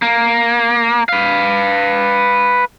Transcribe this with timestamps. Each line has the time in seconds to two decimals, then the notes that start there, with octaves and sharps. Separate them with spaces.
0.02 A#3
1.09 B4 F5